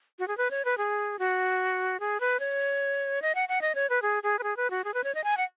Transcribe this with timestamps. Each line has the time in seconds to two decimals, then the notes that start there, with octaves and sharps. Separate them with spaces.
0.19 F#4
0.28 G#4
0.38 B4
0.51 C#5
0.65 B4
0.78 G#4
1.19 F#4
2.00 G#4
2.20 B4
2.40 C#5
3.22 D#5
3.35 F#5
3.49 F#5
3.62 D#5
3.75 C#5
3.90 B4
4.02 G#4
4.23 G#4
4.39 B4
4.43 G#4
4.57 B4
4.70 F#4
4.84 G#4
4.94 B4
5.04 C#5
5.15 D#5
5.24 G#5
5.37 F#5